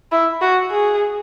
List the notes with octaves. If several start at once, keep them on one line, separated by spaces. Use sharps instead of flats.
E4
F#4
G#4